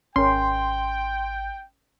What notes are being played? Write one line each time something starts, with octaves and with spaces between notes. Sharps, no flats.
G#1 C#4 A#4 G5 C6